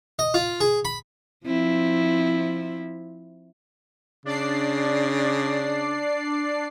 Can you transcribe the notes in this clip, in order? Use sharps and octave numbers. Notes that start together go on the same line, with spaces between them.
D#5
F4
G#4
B5
F3 C4 E4
C#3 D4 D5 C7